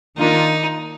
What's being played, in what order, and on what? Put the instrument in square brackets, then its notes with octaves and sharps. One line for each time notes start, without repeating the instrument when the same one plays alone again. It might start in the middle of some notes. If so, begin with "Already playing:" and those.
[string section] D#3 A#3 D4 F4 A#4 [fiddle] D#4